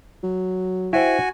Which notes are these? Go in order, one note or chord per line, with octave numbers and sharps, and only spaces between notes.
F#3
E4 F#4 C5 G5 G#5